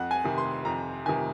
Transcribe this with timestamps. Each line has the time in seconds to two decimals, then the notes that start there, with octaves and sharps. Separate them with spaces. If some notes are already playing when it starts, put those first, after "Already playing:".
Already playing: F2 F#5
0.11 G#5
0.24 C3 D#3
0.38 C6
0.65 F2 A#5
1.06 C3 D#3 G#5